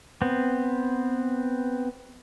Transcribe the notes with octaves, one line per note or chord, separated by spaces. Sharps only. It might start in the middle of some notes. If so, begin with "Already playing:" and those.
B3 C4